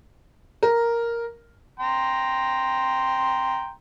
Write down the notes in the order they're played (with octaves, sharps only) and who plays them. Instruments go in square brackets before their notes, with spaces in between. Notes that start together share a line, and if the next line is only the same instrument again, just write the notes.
[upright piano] A#4
[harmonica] G5 A#5 C6